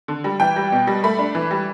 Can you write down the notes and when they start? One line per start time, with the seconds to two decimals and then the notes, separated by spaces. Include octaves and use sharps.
0.08 D3
0.24 G3
0.40 E3 G5
0.56 G3
0.72 B2
0.87 G3
1.04 A3 B5
1.19 D4
1.35 E3
1.51 G3